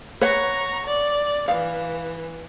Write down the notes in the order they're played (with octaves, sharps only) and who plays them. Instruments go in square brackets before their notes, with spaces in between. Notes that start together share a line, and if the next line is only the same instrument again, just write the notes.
[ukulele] B4 C#5 F#5 [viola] A#5 C#6
[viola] D5
[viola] E3 [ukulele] F5